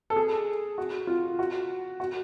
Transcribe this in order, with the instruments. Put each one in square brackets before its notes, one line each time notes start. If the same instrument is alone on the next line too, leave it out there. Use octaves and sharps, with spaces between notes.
[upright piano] A4
G#4
F#4
F4
F#4
F#4